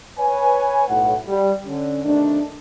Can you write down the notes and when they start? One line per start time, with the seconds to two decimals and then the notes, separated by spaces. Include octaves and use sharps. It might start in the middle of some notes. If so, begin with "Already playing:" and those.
0.18 B4 C#5 G#5
0.88 B1 A2 F#5
1.26 G3
1.66 D3 C#4
2.04 C3 D#3 A3 D4